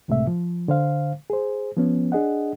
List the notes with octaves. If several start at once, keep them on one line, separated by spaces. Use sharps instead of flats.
C#2 A2 C3 G#3 A3 E5
F3
D3 C5 F5
G#4 C5
F3 B3 C#4
D4 G#4 D#5 F#5